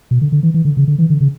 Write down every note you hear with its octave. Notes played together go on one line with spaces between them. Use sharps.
B2
D3
D3
E3
E3
D3
C#3
D3
E3
D3
C#3